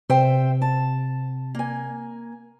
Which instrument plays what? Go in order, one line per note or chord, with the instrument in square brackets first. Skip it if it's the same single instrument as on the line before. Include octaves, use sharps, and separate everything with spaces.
[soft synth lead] C3 [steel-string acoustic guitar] C5 E5 G5
[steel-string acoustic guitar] A5
A#3 G#5